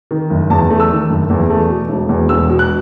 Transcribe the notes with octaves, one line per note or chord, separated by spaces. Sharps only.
D#3
F#1
E2 A5
A3
E6
D#3
F#1
E2
A3
B2
E1
E2
E1 E6
B2
F#6